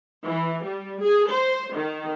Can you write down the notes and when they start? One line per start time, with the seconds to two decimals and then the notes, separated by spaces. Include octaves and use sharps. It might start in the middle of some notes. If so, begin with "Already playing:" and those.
0.24 E3
0.64 G3
1.02 G#4
1.30 C5
1.74 D#3